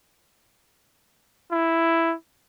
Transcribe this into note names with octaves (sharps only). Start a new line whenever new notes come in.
E4